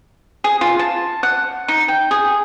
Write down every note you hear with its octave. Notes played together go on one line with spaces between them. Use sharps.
G#4
F4
A5
F#5
D#4
G5
G#4